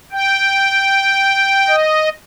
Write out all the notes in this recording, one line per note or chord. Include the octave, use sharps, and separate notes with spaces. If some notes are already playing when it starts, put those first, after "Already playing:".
G5
D#5